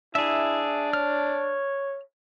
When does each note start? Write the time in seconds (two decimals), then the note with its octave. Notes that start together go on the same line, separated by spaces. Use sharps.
0.15 D4 E4 G#4 E5
0.93 C#5 F6